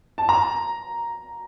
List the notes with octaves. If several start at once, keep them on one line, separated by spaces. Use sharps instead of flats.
A5
A#5